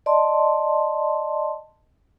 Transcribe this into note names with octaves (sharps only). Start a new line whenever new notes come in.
D5 D#5 A5 C6